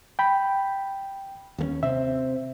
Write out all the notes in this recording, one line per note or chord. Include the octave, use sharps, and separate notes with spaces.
G5 B5
D#2 A3 C#4
C3 C4 E5